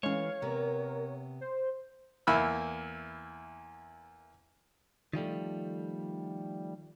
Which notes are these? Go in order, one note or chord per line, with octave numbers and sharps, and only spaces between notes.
E3 G#3 A3 C#4 C#5 F5
C3 B3 A#4
C5
E2 A#3 E4 B5 E6
D#3 F3 G3 A3